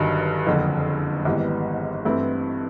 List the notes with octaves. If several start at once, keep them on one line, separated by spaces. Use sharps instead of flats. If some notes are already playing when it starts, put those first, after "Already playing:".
Already playing: G1 G2 D#3 F#3
F#1 F2 D3
G#1 G#2 E3 G3 B3
G2 E3 A3 C4 E4